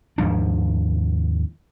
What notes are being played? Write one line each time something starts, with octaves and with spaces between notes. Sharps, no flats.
D#2 G#2 F3 D4